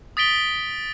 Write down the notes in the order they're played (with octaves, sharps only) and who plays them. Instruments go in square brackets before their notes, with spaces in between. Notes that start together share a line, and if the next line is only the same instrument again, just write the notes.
[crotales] D#6 A6 B6 D7 G7